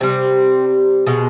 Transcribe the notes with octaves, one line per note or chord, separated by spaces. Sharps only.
C3 G3 C4
B2 G#3